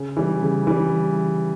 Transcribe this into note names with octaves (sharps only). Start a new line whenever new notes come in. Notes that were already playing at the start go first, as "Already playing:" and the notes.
Already playing: C#3
E3 G3
C#3
E3 G3